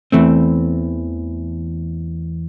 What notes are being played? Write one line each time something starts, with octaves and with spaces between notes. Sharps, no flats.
E2 E3 A3 C4